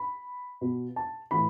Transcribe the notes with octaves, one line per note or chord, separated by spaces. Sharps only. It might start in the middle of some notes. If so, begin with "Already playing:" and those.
Already playing: B5
B2
A5
A2 E3 B5